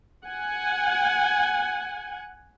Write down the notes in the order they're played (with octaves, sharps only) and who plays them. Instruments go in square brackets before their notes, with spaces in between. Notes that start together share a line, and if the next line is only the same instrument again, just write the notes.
[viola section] F#5 G#5